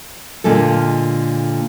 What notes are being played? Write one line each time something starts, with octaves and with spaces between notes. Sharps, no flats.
A#2 D3 G#3 A4